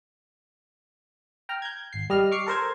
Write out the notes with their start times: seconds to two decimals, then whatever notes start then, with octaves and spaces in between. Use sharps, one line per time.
1.49 G5 A#5 F6
1.62 G6 G#6
1.93 G#1 C7
2.10 G3 D#5 F6
2.32 C#6 D6 F6 C7 C#7
2.46 A4 A#4 C5 G#6